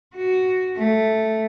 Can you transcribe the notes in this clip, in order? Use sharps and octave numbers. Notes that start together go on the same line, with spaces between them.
F#4
A3